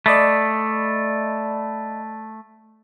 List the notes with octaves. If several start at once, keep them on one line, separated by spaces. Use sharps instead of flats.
A3 D5 D#5 B5